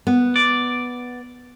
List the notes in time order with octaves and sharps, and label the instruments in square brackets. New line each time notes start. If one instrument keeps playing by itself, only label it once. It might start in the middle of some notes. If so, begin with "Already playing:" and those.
[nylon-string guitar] B3
[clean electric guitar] D5